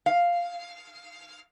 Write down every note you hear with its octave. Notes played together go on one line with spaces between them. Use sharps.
F5